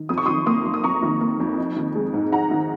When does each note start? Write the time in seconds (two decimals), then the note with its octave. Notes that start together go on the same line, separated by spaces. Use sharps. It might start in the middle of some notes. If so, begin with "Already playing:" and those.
Already playing: D#3
0.09 F2 D#6
0.18 C#6
0.26 D#3 C6 D#6
0.46 A#3 C6 D#6
0.65 F2
0.74 D#6
0.84 F2 A#5 C#6
1.03 D#3
1.21 A#3
1.40 F2
1.58 D#4
1.76 D#3
1.96 G#3
2.14 G#2
2.32 D#4 F#5 A#5
2.51 D#3